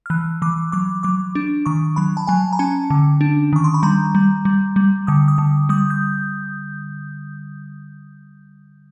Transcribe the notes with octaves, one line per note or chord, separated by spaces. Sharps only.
F6
E3 F#6
E3 D6
F#3 D6
F#3 D6
D4
D#3 C#6
F#3 B5
A5
F#3 G#5
A#5
C#4 A5
D3
D4
D#3 C#6
C6
B5
G3 A#5
G3
G3
G3
D3 D#6
D#6
D3
G3 D#6
G6